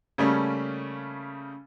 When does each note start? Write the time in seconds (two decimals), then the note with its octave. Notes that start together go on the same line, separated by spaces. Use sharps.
0.18 C#3 G3 A3 A#3 C#4